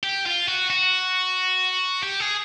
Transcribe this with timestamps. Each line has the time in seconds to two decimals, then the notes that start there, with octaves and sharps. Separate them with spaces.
0.03 G4
0.26 F4
0.48 F#4
0.70 F#4
2.03 G4
2.20 G#4